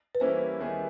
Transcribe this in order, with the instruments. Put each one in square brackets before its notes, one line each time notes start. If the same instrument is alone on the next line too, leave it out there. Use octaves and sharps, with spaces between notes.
[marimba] B4
[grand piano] E3 G3 A#3 C#4 E4 [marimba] C5
[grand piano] D#3 G3 B3 E4 G#4